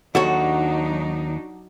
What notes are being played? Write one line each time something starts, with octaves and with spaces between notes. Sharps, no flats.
D#2 F#3 D4 D#4 F#4 A4 C#5